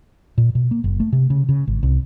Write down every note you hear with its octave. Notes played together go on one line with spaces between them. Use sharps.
A#2
B2
A#3
F#1
A3
C3
C#3
C#3
G#1
C2